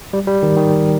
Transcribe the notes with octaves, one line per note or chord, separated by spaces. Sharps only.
G3
G3
D#3
D#3